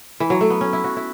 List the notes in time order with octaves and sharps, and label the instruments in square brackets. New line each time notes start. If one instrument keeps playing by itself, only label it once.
[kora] E3
F#3
A3
B3
C#4
E4
F#4
E4